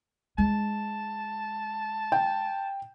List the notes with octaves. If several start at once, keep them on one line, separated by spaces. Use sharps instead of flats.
G#3 D#4 A5
G5